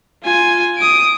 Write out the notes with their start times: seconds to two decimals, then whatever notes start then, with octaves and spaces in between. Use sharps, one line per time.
0.24 F4 G#5
0.78 D#6 D7